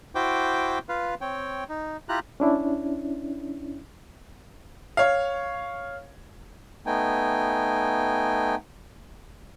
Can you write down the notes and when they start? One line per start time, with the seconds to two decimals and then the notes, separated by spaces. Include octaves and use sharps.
0.15 E4 F#4 C5 G5 D6
0.89 F4 B4 F5
1.21 C4 C#5 G5
1.69 D#4
2.09 E4 F4 G4 A#5 F#6
2.40 C#4 D4 E4
4.97 C#5 F5
6.86 A3 B3 D#4 G5 G#5